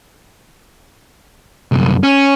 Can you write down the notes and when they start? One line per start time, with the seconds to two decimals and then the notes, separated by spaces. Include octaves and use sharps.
1.72 C2 F#2
2.03 C#4